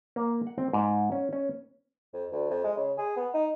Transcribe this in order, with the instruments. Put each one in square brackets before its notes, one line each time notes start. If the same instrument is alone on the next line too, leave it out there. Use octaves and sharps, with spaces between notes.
[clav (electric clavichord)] A#3
F#5
C4
G#2
C#4
C#4
[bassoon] F2
D2
F2
G#3
C#3
G#4
B3
D#4